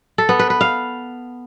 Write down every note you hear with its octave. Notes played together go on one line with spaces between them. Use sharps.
A4
B3
B4
B4
F5